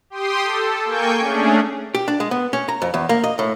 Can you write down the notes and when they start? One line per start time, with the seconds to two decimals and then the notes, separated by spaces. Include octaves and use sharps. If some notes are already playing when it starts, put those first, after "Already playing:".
0.10 G4 G5 C6 D#6
0.43 A4
0.85 A#3 G5 G#5 C#6 G6
1.19 A3 C#4 D4 G#4
1.95 G4
2.08 D4
2.20 G#3
2.31 B3
2.53 C#4
2.69 A#5
2.82 F2
2.94 E2
3.09 A#3
3.24 D#5
3.39 A2